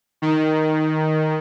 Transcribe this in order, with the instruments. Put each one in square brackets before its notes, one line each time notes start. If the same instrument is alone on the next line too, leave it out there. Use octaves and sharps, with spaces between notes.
[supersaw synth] D#3